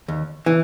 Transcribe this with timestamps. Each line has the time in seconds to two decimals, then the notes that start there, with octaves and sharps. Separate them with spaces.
0.08 D#2
0.46 E3